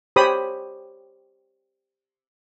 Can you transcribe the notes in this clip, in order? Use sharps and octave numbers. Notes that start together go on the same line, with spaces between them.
G4 C5 C#5 B5 D#6